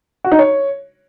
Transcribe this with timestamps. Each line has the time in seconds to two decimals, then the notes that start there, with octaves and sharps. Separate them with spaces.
0.24 F#4
0.32 D#4
0.39 C#5